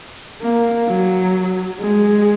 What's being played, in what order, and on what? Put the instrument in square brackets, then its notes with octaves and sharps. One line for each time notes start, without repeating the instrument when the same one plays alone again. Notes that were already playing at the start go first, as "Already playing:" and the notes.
[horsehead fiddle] A#3
F#3
G#3